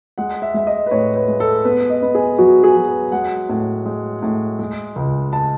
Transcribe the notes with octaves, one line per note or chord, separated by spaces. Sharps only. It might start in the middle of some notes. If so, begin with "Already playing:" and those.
G#3 F#5
E5
G#3 E5
D#5
B4
A2 C#5
B4
G#3
A4
B3 B4
D#5
B3
G#4
F#3 F#4
G#4
F#3
B4
G#3 F#5
A2
G#3
A2
G#3
C#2
A5